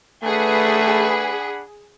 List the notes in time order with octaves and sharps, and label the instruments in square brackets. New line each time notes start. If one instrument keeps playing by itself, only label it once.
[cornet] A3 [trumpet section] D4 F#5 B5 [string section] G#4 [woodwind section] B4